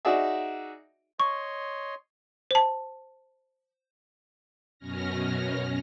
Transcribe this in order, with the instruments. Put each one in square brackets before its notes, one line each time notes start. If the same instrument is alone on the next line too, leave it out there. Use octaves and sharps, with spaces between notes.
[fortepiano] D#4 F#4 G#4 D5 E5
[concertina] C#5 D#5 C6 [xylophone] C#6
[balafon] C5 A5
[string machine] F#2 B2 C#4 F6 A#6